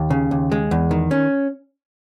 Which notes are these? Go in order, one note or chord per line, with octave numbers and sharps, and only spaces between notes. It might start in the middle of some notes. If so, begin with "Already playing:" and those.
Already playing: D#2
C#3
D#2
G#3
E2
D#3
C#4